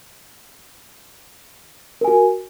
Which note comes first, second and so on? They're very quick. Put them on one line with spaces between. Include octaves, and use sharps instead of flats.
A#4 G#5 F#4